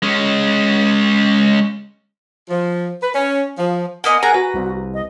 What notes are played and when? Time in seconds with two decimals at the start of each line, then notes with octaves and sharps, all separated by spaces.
0.02 G#3 C#4
2.49 F3
3.01 B4
3.13 C#4
3.57 F3
4.04 A#3 B3 D#5 F#5 G#5
4.23 G#4 A#4 F#5 G#5 A#5
4.34 F#4 B4
4.54 C2
4.94 D#5